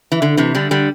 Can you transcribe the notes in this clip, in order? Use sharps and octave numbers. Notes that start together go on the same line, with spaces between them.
E3
D3
C3 E3
D3 G3
D3 G3